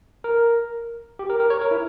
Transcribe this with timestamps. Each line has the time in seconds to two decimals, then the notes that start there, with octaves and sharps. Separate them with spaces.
0.24 A#4
1.19 G4
1.30 A#4
1.40 A#4
1.50 C#5
1.61 A#4
1.71 E4